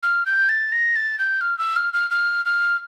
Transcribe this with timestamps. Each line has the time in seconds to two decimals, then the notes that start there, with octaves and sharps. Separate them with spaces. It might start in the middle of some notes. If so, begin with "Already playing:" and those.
0.03 F6
0.26 G6
0.49 A6
0.72 A#6
0.96 A6
1.19 G6
1.41 F6
1.59 E6
1.76 F6
1.93 F6
2.10 F6
2.45 F6